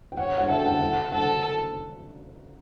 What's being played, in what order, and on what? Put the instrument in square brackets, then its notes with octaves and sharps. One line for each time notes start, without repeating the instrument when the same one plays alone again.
[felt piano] G5
[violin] C#5 [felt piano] F#5
[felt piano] F#5
[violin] A4 [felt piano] E5
[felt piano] G5
F#5
F#5
[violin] A4 [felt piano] F#5